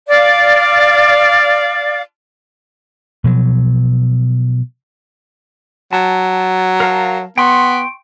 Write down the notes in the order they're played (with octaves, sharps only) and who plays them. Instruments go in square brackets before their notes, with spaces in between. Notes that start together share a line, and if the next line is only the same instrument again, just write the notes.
[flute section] D5 F5
[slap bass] B2 F3 F#3
[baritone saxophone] F#3 [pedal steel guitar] A5
[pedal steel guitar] A#4 F5 A5
[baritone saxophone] B3 [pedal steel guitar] G5 C6 C#6